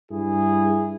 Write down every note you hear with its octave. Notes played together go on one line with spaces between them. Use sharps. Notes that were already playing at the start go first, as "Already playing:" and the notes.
G2 E4 G#4